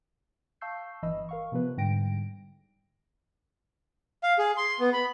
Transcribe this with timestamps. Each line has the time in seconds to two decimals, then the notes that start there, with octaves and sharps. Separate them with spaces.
0.61 F5 A5 C#6 E6 G6 C7
1.03 G1 E3 D#5 B5 E6
1.29 A#4 F5 C#6
1.52 C3 F3 B3 B4
1.77 G#2 D3 G3 G5 A#6 D7
4.23 F5
4.39 G#4
4.57 C6
4.80 B3
4.93 B5